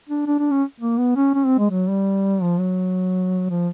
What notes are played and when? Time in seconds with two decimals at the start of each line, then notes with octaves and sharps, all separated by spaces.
0.09 D4
0.27 D4
0.39 D4
0.51 C#4
0.80 A#3
0.98 B3
1.16 C#4
1.34 C#4
1.45 C4
1.59 G#3
1.70 F#3
1.88 G3
2.42 F3
2.59 F#3
3.50 F3